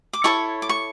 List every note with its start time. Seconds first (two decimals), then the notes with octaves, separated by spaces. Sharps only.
0.13 D6
0.24 E4 A4 C#5 C#6
0.62 D6
0.69 C#6